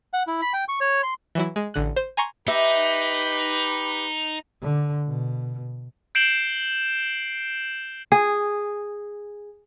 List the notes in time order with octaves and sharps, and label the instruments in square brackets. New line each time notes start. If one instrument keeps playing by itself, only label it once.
[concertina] F#5
E4
B5
G5
C#6
C#5
C6
[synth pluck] E3 F#3 E4
G#3
A1 D3 F#6
C5
G#5 A#5 C6 C#6 G#6
[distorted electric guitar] D#4 [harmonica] G4 B4 [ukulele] E5
[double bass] D3
B2
[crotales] G6 C7 D7 E7 F#7 G7
[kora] G#4